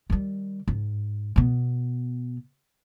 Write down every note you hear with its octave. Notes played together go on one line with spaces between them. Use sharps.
D#3 G3
G#2
B2 B3